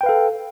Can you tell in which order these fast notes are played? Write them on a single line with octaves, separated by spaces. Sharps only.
G5 B4 F5 A4